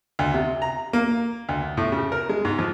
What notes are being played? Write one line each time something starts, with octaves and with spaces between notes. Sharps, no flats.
D2
C3
A#5
A#3
D2
A2
C#3
A#4
G#3
G#2
F3